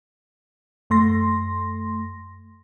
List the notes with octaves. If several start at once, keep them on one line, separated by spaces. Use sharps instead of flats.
F#2 A3 C6 A#6